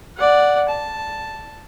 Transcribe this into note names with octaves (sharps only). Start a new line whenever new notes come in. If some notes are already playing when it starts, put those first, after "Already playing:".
D5 F#5
A5